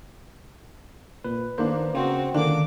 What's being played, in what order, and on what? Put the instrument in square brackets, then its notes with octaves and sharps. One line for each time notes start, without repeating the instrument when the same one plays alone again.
[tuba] A#2 [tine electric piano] B4
[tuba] D#3 [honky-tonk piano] A#3 B3 D4 [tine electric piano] C5
[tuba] C#3 [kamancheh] C4 F#4
[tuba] C#2 [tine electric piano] D3 D#3 [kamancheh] A#3 D6 [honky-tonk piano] D4